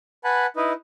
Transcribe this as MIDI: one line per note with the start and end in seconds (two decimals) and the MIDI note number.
0.24 0.46 71
0.24 0.46 78
0.24 0.46 80
0.24 0.46 81
0.24 0.46 83
0.56 0.73 63
0.56 0.73 64
0.56 0.73 71
0.56 0.73 75